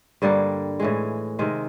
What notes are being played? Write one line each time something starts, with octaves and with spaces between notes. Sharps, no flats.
G2 D3 G3 A#3
A2 E3 G#3
C3 D#3 G#3